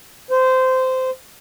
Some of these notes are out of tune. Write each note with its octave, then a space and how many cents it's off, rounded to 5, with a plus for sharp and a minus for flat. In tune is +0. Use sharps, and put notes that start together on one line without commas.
C5 -15